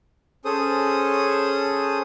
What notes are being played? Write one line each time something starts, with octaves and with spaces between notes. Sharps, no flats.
C#4 G#4 A4 C5 D#6